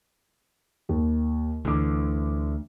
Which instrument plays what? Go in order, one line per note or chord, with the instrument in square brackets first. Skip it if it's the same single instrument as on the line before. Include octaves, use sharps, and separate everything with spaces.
[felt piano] D#2
[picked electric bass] D2 D3 [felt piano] E3 D6